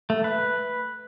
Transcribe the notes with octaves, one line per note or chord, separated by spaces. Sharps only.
A3
B4